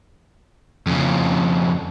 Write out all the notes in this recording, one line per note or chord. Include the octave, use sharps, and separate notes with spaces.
F2 C#3